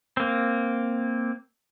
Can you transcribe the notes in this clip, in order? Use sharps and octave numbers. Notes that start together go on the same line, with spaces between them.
A#3 C4